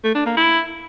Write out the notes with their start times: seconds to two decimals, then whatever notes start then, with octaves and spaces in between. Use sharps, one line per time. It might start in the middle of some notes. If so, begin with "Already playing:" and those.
0.04 A3
0.15 D4
0.26 A#3
0.37 E4